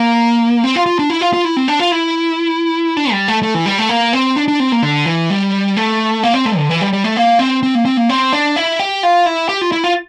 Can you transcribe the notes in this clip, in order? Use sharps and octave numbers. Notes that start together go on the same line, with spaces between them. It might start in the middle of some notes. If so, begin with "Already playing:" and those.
Already playing: A#3
C4
F4
F4
D4
E4
F4
F4
E4
C4
D4
F4
E4
D4
G3
A3
A3
E3
G3
A3
A#3
C4
D4
D4
C4
A#3
D3
E3
G3
A3
A#3
C4
A3
D3
E3
G3
G3
A3
A#3
C4
C4
A#3
C4
A#3
C4
D4
E4
G4
F4
E4
G4
F4
E4
F4